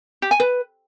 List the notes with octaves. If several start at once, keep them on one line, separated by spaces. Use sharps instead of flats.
G4
G#5
B4